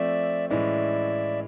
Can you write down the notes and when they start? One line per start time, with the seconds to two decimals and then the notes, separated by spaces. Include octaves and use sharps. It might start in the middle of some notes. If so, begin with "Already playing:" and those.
Already playing: F3 A3 C4 D5 E5
0.50 A2 E3 G#3 C#4 D5 E5